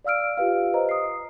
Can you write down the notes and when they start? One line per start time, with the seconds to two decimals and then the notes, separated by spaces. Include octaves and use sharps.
0.05 D5 F5 E6 F6 D7
0.38 F4 G4 B4 F5
0.73 B4 C5 D#5 A#5
0.89 D#6 C7